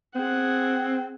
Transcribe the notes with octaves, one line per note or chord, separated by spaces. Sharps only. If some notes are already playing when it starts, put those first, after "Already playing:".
C4 G#4 F#5